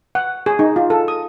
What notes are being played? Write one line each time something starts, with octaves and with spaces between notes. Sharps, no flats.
F#5
G#4
D#4
F4
A4
D#6